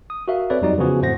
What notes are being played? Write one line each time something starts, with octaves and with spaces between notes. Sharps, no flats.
D#6
F#4 A#4 E5 F5
C4 A4 B4 C#5 D5
F2 F#3 G3 D#4 F#4 D5
C#3 E3 F3 B3 F#4 G#4
F2 A2 A3 C5 F#5 A#6